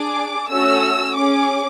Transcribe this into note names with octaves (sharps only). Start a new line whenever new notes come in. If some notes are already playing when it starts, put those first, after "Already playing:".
Already playing: D4 G#4 D6
A3 C#4 F#4 E6
C#4 G#4 D6